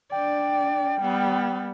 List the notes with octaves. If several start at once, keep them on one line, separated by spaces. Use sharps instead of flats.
D4 D5 G5
G3 B3